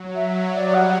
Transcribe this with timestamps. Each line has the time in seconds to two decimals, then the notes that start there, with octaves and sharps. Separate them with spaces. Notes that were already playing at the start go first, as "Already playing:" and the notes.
Already playing: F#3
0.14 E5
0.53 G3 D5
0.73 F#5